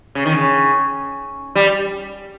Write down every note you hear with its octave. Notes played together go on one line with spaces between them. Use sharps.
C#3
D#3
C#3
G3